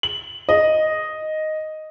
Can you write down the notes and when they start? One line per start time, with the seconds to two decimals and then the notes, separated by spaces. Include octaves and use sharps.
0.03 F#7
0.49 D#5